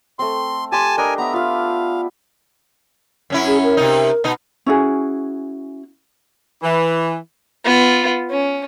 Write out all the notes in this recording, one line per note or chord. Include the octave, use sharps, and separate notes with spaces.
A3 C4 C6
G4 G#5 A5 C6
D4 A#4 D#5 G#5
B3 B4 E5 A#5
F4 E5 F5
F#2 C#4 E4
G#4
A#4
C3 D#4
B2 D#4
C#4 E4 F#4 G#4
E3
B3 F4
C#4